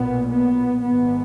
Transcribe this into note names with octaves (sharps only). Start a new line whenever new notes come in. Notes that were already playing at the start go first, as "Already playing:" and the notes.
Already playing: B1 A#2 B3
B3
G#1 G#2 B3